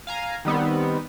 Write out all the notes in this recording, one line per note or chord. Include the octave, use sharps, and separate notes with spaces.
F5 G#5 A#5
D#3 G3 B3 C4